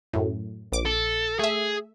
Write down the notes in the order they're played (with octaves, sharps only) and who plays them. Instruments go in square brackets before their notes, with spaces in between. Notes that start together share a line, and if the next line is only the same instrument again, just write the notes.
[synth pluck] F#2 A2
A#1 D6
[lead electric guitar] A4
[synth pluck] A3 E5 [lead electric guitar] G#4